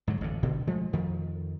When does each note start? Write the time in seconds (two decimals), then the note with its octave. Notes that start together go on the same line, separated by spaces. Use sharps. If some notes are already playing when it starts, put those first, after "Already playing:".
0.07 G#2 D3 F#3
0.21 A1 F2 D3
0.43 G1 B2 D3 D#3
0.67 F3 G#3 A3
0.93 F2 D#3 F3